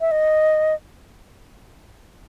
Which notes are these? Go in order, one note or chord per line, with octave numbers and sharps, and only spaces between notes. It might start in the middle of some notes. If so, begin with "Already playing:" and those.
E5
D#5